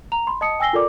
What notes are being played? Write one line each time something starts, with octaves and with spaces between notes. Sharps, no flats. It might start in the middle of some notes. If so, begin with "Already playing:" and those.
A#5 F7
B5 C6
D#5 A5 D#6 C#7
G5 G#5 E6 A#6 C7 G7
F4 A4 A#4 D5 D6